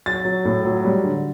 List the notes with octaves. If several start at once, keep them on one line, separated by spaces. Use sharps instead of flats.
F#3 A6
F#3
A2
F#3
G3
D3